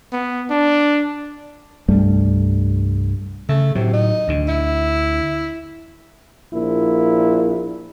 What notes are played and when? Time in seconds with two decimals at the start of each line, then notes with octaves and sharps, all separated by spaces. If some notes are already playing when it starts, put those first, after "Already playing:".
0.12 B3
0.50 D4
1.88 C2 G2 G3 A3
3.49 C#3 A3
3.75 A2 C3 F#3
3.93 D#4
4.28 D2 D3
4.48 E4
6.52 A#1 A#2 E4